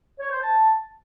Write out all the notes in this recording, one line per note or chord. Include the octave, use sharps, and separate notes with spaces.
C#5
C5
A5